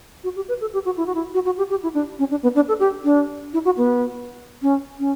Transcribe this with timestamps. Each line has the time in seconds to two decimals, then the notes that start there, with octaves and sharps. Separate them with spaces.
0.24 F#4
0.36 G4
0.49 B4
0.61 A4
0.74 G4
0.85 F#4
0.97 E4
1.07 F#4
1.15 E4
1.34 F#4
1.45 F#4
1.58 G4
1.70 G4
1.83 E4
1.94 D4
2.19 C#4
2.31 D4
2.43 B3
2.55 D4
2.68 A4
2.80 G4
3.04 D4
3.53 E4
3.65 F#4
3.77 B3
4.62 C#4
4.99 C#4